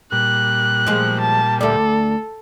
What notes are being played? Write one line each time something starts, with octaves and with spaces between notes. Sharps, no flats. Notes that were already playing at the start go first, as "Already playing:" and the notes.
A#2 G3 F#6
F3 G#3
A5
D2 A4 D5